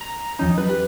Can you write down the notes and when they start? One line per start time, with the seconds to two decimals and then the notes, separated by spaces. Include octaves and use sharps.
0.01 A#5 A#6
0.39 E2 F3 C#4 D#4
0.58 F#3 B4
0.69 G4